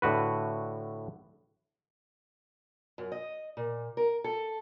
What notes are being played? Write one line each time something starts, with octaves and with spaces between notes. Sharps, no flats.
A2 D3 F#4 B4
F#2
D#5
A#2
A#4
A4